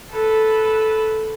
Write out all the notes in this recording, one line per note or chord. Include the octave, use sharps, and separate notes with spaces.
A4 B4